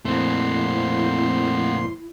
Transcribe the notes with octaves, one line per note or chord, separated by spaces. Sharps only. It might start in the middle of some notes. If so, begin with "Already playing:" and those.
F2 A#2 A3 C4 E4 C6